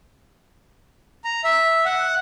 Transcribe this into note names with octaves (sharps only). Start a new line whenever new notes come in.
A#5
E5
F#5